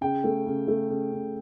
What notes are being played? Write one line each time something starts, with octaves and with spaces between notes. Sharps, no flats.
C#3 G5
A3
C#3
A3
C#3
C#3